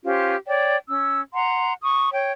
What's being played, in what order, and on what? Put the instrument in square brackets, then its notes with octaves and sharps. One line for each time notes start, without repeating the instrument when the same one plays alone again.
[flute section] C#4 F4 G4 C5
C#5 D5 G5
C#4 E6
F#5 A#5 C6
C#6 D#6
C#5 G5